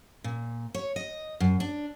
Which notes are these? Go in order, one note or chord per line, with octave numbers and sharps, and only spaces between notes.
A#2
C#5
D#5
F#2
D4